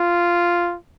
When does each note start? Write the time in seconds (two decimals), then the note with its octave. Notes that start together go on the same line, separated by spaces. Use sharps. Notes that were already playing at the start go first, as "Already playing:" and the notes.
Already playing: F4